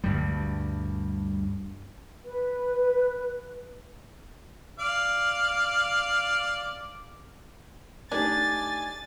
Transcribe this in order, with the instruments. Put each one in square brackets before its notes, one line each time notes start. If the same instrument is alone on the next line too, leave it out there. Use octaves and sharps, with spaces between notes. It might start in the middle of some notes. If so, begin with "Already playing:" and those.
[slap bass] D2 G2 G3
[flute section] B4
[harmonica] D5 F5
[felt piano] A3 D#4 G4 [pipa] D4 [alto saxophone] G#5 [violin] A6